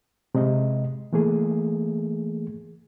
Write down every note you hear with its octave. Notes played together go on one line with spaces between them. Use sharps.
C3 G#3 D#5
E3 A3 A#3 G#4